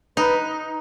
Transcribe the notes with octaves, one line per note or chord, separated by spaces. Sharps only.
D#4 B4